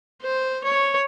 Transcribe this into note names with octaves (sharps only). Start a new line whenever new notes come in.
C5
C#5